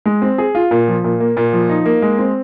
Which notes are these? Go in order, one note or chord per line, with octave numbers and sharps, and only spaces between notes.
G#3
C4
G#4
F4
A#2
F3
A#2
A#3
A#2
F3
D#4
A#3
G#3
C4